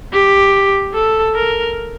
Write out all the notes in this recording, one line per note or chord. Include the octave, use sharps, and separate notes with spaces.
G4
A4
A#4